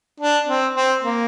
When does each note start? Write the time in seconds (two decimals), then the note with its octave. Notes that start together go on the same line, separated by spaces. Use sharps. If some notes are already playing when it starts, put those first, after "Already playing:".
0.20 D4
0.47 C4
0.75 C4
1.02 A#3